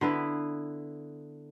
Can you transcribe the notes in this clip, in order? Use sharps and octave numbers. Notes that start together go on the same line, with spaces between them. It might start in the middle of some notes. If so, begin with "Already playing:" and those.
D3 B3 E4 B4